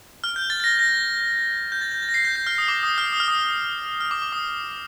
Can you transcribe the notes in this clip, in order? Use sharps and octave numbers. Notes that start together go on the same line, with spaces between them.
F6
G6
A6
A6
A#6
A#6
G6
A6
G6
A6
A#6
C7
G6
G6
F6
D#6
D6
D#6
F6
D#6
F6
D#6
F6
D6
D6
D#6